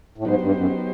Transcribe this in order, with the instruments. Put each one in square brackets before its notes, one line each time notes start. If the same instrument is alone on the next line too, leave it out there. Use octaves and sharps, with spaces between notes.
[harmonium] A2
[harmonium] G#2 [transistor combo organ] F#3 B3 D#4 G4 C5
[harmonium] G2
F#2